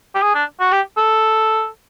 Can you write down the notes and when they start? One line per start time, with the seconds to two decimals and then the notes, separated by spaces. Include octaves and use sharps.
0.15 G4
0.22 G#4
0.35 D4
0.60 F#4
0.72 G4
0.97 A4